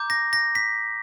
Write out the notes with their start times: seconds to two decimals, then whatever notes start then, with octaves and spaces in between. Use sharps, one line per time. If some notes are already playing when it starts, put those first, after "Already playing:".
Already playing: A#5 D6 G6
0.10 A#6
0.33 A#6
0.55 B6